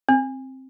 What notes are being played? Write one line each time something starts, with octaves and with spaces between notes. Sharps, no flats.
C4